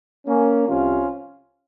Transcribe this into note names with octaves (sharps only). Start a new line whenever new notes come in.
A#3 C#4
C2 C3 F3 C#4 F4